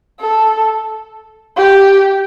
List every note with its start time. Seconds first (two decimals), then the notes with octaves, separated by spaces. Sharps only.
0.20 A4
1.57 G4